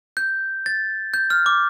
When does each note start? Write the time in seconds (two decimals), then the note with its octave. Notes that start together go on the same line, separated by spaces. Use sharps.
0.17 G6
0.66 A6
1.14 G6
1.30 F6
1.46 D6